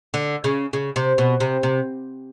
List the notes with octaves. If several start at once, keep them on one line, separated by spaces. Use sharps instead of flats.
D3
C#3
C#3
C3
B2
C3
C3